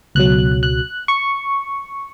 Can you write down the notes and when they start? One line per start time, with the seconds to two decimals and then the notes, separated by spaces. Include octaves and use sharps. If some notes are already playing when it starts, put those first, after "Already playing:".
0.15 C#2 B2 F#3 F#6
0.63 F#6
1.08 C#6